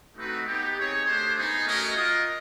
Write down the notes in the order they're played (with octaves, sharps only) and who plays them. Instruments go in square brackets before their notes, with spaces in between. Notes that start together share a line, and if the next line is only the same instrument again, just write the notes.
[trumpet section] A3 C4 D#4 F#4 B4
B3 D#4 G4
C4 D#4 G#4 C#5
A3 D4 G4 C5
B3 D#4 G#4
A3 C#4 F#4 A#4 D#5
F4 A#4 D#5